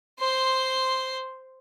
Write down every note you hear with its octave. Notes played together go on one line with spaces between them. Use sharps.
C5 C6